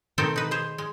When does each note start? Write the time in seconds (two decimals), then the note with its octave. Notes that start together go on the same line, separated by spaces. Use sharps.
0.18 B2 D#3 C4 D#4 A4 C5
0.36 D#4 B4
0.51 G#4 C5
0.78 G#3